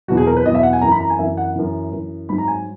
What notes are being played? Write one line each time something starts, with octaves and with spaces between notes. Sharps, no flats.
E2 B2 F#3 F#4
G#4
A#4
B4
E2 B2 F#3 D#5
E5
F#5
G#5
F#2 E3 A#5
B5
A#5
G#5
F#2 E3 E5
F#5
F#2 E3
F#2 E3
G#2 F#3 B5
A#5
G#5